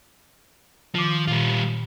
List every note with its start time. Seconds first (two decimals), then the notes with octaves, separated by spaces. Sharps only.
0.95 D#3 F3 D6
1.28 A#2 G3 F4